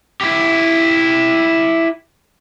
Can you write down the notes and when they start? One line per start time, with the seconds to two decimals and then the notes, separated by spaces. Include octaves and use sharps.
0.21 E4 G4